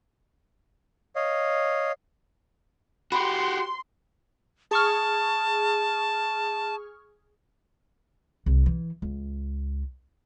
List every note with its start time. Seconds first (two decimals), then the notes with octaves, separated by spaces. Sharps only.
1.16 C#5 D#5 F5
3.12 F#4 G4 B5 C6
4.71 G#4 A5 C#6 F6
8.46 C2
8.66 E3
9.02 C#2